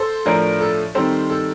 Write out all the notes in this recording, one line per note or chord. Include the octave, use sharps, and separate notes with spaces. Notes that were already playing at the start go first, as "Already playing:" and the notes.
Already playing: A4 C5
A2 F3 A3 D4 A#4
A4
D#3 G3 C4 A4 C5
A4